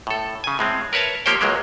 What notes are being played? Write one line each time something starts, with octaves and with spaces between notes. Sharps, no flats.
A2 A4
C#3 G#5
A2 G#3 C4
A#4 B4 C#5 E5 A5
F3 A#3 G4 C5 C#5 G5
C#2 F#3 G#3 A#3